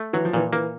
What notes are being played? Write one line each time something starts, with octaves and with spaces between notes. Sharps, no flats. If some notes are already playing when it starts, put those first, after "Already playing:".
Already playing: A3
E3 F#3
F3
A#2 E3
E3 A#3